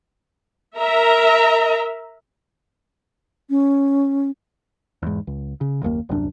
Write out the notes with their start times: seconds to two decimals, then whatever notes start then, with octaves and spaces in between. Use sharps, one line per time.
0.79 A#4 E5 A#5
3.50 C#4
5.02 E2 G#2
5.27 C#2
5.61 C#3
5.83 F#1 D#2 A#3
6.09 D#1 C2 F#2 D4